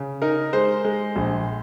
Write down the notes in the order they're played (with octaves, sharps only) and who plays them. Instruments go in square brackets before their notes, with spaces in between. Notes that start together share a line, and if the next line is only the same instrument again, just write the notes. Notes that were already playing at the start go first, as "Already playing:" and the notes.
Already playing: [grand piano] C#3
D#4 A#4
G#3 C5
G#3
A#1